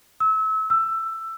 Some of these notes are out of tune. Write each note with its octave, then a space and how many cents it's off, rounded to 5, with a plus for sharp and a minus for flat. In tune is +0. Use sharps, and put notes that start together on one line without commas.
E6 -30
E6 +15